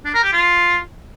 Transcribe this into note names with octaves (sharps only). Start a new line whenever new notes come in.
D4
A#4
G4
F4